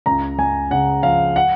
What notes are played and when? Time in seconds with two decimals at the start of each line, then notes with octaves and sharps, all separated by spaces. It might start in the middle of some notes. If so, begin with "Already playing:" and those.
0.06 C#2 A#5
0.38 C#2 G#5
0.71 C#3 F#5
1.03 F3 F5
1.36 F#5